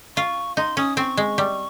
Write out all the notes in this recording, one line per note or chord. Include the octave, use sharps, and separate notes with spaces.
F4 C#6
D#4 C6
C#4 D#6
C4 C#6
G#3
G3